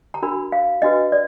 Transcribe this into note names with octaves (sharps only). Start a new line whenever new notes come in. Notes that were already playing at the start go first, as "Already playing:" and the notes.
A#5
D4 F#4 A#4 B5
F5
D4 F#4 B4 D#5
D5